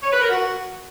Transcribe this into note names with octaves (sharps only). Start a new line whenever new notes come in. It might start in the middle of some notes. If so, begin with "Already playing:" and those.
C#5
B4
A#4
F#4